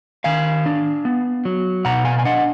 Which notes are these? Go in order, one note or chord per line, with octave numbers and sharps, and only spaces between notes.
D#3 F5 G#5
D4
B3
F#3
B2 F#5 A#5
F5 G#5
G#5
D4 D#5 F#5